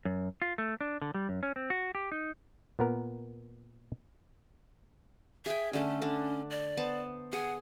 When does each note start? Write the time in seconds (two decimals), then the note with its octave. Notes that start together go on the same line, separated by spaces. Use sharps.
0.05 F#2
0.42 F4
0.58 A3
0.81 D4
1.02 D3
1.14 G3
1.29 F#2
1.43 C#4
1.56 C4
1.70 F#4
1.95 G4
2.12 D#4
2.79 A#2 B3 A#4
5.46 G#4 E5 G5
5.73 D3 A3 C#4
6.02 D3 D4
6.51 D5
6.77 B3 C5 A5
7.33 G#4 F#5